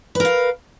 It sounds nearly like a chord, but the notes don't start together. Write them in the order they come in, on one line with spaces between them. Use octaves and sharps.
B4 A#4 F5